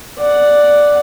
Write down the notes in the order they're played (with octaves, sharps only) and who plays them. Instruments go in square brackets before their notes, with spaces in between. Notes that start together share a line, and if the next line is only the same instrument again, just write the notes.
[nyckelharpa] D5 F#5